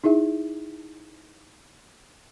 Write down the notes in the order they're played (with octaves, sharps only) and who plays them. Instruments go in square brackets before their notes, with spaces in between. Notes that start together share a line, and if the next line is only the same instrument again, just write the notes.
[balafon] D#4 E4 G#4 E5